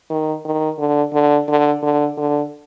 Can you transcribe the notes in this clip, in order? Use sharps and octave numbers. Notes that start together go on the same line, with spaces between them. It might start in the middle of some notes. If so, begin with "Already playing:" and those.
D#3
D#3
D3
D3
D3
D3
D3